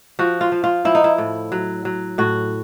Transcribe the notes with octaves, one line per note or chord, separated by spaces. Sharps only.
F3 F#4
F4
F3
F4
F3 E4
D#4
E4
A2
F#3
F#3
A2 F#4